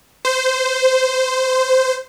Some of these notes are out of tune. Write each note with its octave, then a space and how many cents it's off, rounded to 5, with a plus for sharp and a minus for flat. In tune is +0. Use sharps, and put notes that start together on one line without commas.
C5 -15